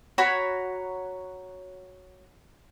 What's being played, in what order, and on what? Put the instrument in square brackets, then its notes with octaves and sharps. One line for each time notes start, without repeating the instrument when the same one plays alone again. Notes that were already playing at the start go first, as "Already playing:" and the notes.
[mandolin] F#4 C#5 A#5 B5